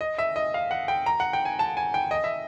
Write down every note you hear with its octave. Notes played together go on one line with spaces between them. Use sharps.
D#5
E5
D#5
F5
F#5
G5
A#5
F#5
G5
G#5
A5
G#5
G5
D#5
E5